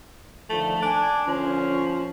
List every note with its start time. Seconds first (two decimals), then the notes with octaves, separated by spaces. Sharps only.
0.50 D3 D#3 F3 A3
0.83 D4 G#5
1.27 A#2 D3 F3 C#4